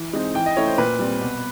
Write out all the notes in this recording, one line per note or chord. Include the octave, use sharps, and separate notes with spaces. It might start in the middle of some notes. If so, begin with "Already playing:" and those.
Already playing: E3
G#3 C4 D#4
E3 G5
D#5
A3 C#4 E4 C#5
C5
A#2 B4
G3 C4
B2